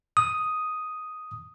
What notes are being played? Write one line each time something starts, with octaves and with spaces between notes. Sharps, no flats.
D#6